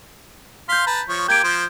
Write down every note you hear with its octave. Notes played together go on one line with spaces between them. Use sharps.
F5 C6 G6 B6
B4 A5 A#5
F3 C#5
A#3 G4 G6 G#6 D7
F3 C5